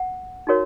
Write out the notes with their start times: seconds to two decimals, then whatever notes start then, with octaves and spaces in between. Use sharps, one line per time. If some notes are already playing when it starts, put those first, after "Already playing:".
Already playing: F#5
0.47 D#4 F#4 A#4 C#5